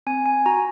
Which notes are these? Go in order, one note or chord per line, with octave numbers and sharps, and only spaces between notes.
C4 G#5
G#5
F#4 A#5